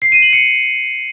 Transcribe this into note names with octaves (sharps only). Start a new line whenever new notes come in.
C7
D#7
F#7
C#7